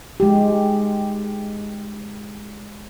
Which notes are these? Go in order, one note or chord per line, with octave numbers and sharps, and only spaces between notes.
G#3 G4